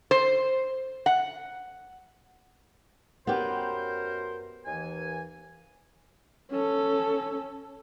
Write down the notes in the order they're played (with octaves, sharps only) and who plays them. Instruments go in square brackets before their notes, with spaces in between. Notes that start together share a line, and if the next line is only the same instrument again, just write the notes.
[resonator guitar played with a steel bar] C5
F#5
[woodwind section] F#2 A#4 C5 [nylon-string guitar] B3 G4
[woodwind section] D#2 E3 G#5
[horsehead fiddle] C#4 A4